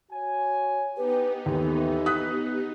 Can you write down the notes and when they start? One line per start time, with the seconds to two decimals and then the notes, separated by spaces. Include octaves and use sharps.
0.12 F#4 C#5 G#5
0.97 B3 D#4 G4 B4
1.46 D#2 A2 E3 G4
2.06 D#6 F#6 B6